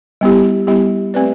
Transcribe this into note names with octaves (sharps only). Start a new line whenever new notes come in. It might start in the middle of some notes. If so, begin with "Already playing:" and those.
G3 B3 E4 G4
G3 B3 E4 G4
A3 C4 G4 B4 D5